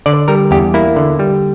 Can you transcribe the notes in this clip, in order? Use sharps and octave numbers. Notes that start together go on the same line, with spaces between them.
D3 D5
G3 A#4
E2 G4
A#3 E4
D3
G3